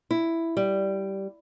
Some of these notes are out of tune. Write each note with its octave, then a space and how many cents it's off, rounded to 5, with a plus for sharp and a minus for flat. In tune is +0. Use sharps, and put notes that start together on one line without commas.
E4 +5
G3 -10